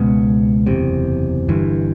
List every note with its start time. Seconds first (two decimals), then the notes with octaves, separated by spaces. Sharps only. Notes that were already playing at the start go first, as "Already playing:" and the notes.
Already playing: C#2 B2 G#3 B3
0.67 F#1 E2 C3
1.49 G1 G2 E3